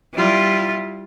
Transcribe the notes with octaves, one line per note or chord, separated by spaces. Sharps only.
G3 E4 F4